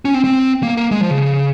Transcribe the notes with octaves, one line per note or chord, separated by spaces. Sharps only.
C#4
C4
C4
A#3
A#3
G#3
F3
C#3